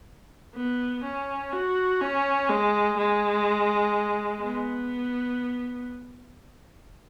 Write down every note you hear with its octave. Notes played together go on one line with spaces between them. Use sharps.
B3
C#4
F#4
C#4
G#3
G#3
B3